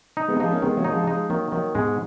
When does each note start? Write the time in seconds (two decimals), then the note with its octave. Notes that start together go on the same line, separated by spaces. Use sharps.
0.17 D#4
0.28 G#3 B3
0.39 F3 G#3 D#4
0.51 A#3 C#4
0.62 D#3 G#3 B3
0.77 F#3 A#3
0.84 D#4
0.92 F3 G#3
1.07 F3 G#3 D#4
1.29 D#3 F#3 A#3
1.52 D#3 F#3 A#3
1.75 G#2 B2 G#3